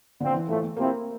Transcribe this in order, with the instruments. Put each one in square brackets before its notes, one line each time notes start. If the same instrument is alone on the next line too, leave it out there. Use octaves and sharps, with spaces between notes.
[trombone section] A#2 F3 C4 [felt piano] D3
[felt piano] E3
[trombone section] A2 F3 A3 [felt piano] E3
[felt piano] A3
[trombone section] C3 F3 C4 E4 [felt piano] A#3